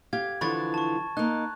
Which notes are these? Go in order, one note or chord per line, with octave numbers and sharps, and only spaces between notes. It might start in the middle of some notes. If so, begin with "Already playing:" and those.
G4 F5 G#6
D3 E3 F3 B5 C#6 A6
A5 C#6
A#3 D#4 F#6